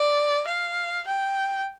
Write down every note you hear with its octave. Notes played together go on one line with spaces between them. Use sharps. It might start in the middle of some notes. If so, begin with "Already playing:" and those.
Already playing: D5
F5
G5